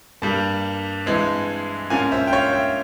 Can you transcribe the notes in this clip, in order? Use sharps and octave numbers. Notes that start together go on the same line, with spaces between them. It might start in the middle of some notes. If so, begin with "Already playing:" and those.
G2 G3 A#3
G2 E3 G#3 C4
G#2 F3 A#3 C#4 F5 G#5
C5 E5
G5
C#5 F5
E5 G5